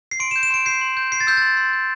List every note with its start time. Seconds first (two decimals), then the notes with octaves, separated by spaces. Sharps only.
0.11 C7
0.20 C6 D7
0.31 E7
0.36 G6
0.43 E7
0.50 C6 D7
0.65 G6 C7
0.81 C6
0.97 G6
1.12 G6 C7
1.21 A6
1.27 E6 G6
1.37 C6 A6
1.57 C6
1.73 G6